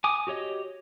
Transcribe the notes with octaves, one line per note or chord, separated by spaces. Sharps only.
G#5 D6 D#6
F#4 G4 C#5 D#5